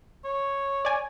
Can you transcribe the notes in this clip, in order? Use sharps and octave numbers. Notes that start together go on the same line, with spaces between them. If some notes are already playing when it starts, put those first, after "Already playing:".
C#5
D5 G#5